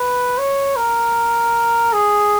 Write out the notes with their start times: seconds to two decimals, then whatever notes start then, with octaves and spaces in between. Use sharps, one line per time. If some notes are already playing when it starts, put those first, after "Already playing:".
Already playing: B4
0.38 C#5
0.76 A#4
1.93 G#4